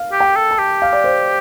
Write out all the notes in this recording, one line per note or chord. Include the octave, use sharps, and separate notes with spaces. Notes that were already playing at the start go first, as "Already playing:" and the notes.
Already playing: F5
G4
G5
A4
A5
G4
F5
D5
C5